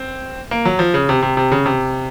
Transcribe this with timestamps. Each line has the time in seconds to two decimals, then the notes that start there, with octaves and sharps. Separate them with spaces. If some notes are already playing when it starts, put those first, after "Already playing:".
Already playing: C4
0.51 A#3
0.65 F#3
0.79 F3
0.94 C#3
1.09 C3
1.22 C3
1.37 C3
1.52 C#3
1.66 C3